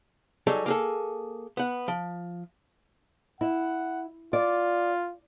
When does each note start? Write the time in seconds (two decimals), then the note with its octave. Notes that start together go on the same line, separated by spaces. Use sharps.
0.47 F#3 G3 D#4 G#4 A4
0.66 A#3 G#4 A4
1.57 B3 F#5
1.88 F3
3.41 E4 F#5
4.33 F4 D5